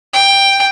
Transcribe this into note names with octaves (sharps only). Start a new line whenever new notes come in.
G5